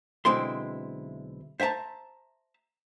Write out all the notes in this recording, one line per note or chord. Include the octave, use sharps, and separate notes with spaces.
B1 D3 G#3 C4 E4 C6
C5 E5 F#5 A5 A#5